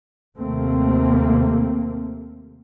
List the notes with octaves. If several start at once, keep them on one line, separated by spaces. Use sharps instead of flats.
D#2 C3 A3 A#3 C4